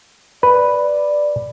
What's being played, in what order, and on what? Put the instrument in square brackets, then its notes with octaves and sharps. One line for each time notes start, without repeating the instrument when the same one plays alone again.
[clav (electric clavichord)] B4 [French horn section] D5